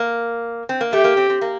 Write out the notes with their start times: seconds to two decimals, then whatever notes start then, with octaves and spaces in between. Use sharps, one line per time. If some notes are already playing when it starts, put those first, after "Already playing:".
Already playing: A#3
0.69 C4
0.81 A#3
0.92 A3 G4
1.04 A#3
1.17 C4
1.30 C4
1.41 A#3